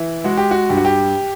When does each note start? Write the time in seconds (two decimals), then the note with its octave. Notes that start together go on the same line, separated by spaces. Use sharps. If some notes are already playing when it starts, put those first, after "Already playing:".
Already playing: E3 E4
0.24 G#3 F#4
0.37 G4
0.51 F#4
0.70 G2 G4
0.77 F#4
0.85 G4